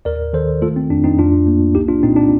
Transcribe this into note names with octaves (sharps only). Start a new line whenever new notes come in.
D#2 A#4 D5
D#3 A4 C5
A3 F4 A4
C4
F2 D4
C4 D#4
F2 D4 F4
A#3
C2 D#4 G4
D4 F4
A#2 C4 D#4
D4